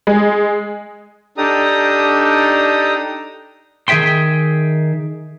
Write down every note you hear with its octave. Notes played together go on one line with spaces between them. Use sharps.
G#3
D4 D#4 G4 A4 A#5 D#6
D#3 G#4 C#5 E5 G5 C6